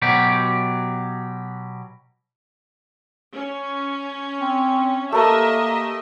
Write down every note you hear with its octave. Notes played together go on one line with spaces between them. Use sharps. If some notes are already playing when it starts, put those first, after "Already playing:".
B2 F#3 G4
C#4
C4
A3 A#3 G4 A#4 D#5 E5